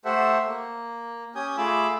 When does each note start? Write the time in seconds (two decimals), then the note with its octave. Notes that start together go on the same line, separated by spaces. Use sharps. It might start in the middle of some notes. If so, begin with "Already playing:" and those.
0.05 A3 G4 A4 C5 E5 F#5
0.47 A#3
1.35 C#4 G4 G#5 D#6 G6
1.57 A3 F4 G#4 B5 D6 E6